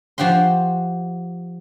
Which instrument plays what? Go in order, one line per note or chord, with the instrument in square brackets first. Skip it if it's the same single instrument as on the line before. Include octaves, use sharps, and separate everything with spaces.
[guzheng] F3 F#4 G4 F#5 C6